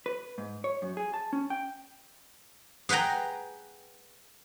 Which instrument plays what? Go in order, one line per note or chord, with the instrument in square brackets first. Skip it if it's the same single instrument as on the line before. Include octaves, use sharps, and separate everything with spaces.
[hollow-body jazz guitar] B4
G#2
C#5
F#2
G#4
A5
C#4
G5
[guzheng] G#4 B4 F#5 G5 A#5